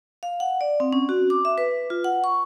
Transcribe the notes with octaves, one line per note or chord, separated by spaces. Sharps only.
F5
F#5
D5
C4
C#4
F#4
D6
E5
B4
F4
F#5
C#6